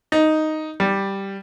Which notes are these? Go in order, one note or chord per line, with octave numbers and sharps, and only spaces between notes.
D#4
G3